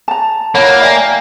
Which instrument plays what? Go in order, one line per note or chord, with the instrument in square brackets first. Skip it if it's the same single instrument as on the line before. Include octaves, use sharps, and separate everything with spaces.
[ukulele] A5 A#5
[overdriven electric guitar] A#3 [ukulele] E4 A5 [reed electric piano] C#5 F#5 B5
[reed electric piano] D5 G5 G#5 [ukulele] E5